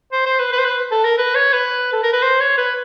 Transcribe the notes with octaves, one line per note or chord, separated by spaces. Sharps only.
C5
C5
B4
B4
C5
B4
A4
A#4
B4
C#5
B4
A4
A#4
B4
C5
C#5
B4